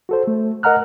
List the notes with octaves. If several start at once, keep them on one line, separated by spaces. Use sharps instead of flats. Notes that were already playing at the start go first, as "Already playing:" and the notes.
F#4 A4 C5
A3
A#4 D#5 F#5 A#5 F6 F#6